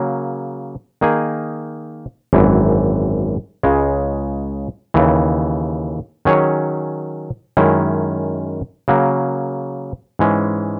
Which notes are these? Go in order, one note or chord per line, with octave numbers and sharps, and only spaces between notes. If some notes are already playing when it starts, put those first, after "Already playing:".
Already playing: C#3 F#3 A#3
D#3 A#3 D#4 G#4
G#1 F#2 E3
C#2 C#3 G#3
D#2 C#3 E3
D#3 F#3 C#4 G#4 C#5
F#2 D#3 G#3 C#4 E4
C#3 F#3 A#3
G#2 E3 G#3 C#4